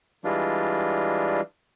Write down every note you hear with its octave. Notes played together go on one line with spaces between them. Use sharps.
E3 G3 G#3 D4 F4